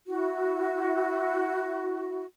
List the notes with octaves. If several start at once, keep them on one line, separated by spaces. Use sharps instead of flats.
E4 F#4